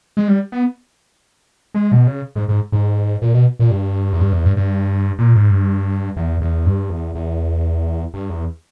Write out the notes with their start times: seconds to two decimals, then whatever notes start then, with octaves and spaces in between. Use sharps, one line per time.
0.17 G#3
0.28 G3
0.52 B3
1.75 G#3
1.92 B2
2.07 C#3
2.36 G#2
2.48 G#2
2.72 G#2
3.22 A#2
3.34 B2
3.60 A#2
3.71 G2
4.13 E2
4.20 G2
4.33 E2
4.45 G2
4.57 G2
5.19 A#2
5.35 G#2
5.51 G2
6.16 E2
6.41 E2
6.66 G2
6.90 E2
7.15 E2
8.14 G2
8.30 E2